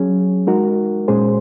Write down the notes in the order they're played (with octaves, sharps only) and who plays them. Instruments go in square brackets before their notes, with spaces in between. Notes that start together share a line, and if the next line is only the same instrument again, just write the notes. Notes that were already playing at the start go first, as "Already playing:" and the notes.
Already playing: [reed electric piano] F#3 C#4 G#4
G#3 D#4 F#4 A#4
A#2 G#3 C#4 G#4 C5